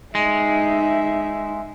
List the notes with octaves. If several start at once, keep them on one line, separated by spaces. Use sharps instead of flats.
G#3 D#4 E5